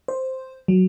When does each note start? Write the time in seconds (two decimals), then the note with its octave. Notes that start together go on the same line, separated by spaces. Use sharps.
0.08 C5
0.68 F#3